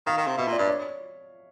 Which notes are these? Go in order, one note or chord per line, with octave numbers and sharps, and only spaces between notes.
D#3 F5
D#3
C3
B2 E5
A#2 D5
G2 D5
C#5